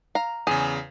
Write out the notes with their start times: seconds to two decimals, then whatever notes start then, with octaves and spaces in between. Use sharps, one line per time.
0.15 F5 A#5
0.47 E2 C#3 G#4